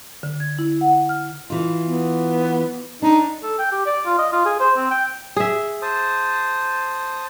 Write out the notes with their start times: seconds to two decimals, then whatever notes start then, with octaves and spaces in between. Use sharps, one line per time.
0.23 D3
0.40 G#6
0.59 E4
0.81 F#5
1.09 F6
1.50 E3 F4
1.86 B3
3.02 D4 D#4
3.43 A4
3.59 G5
3.72 G4
3.86 D5
4.06 F4
4.18 D#5
4.33 F4
4.46 G#4
4.60 C5
4.77 C4
4.91 G5
5.37 G#4 E5
5.82 C5 A5 D#6